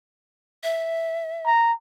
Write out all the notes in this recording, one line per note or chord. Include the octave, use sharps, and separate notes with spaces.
E5
A#5